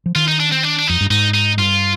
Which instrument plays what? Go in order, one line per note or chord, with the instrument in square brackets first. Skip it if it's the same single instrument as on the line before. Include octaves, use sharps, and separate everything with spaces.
[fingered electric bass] F3
[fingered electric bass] D#3 [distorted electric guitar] F4
[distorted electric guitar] D#4
D4
C4
D4
D4
[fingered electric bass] F2 [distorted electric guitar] D#4
[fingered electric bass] G2
[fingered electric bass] G#2 [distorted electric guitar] D#4
[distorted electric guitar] D#4
[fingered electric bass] G2 [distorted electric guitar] F4